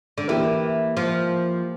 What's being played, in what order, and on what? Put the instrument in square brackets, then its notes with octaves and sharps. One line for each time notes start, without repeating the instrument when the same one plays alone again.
[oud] D3
[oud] E3 [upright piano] A#3 E4 G4 A#4
[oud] F3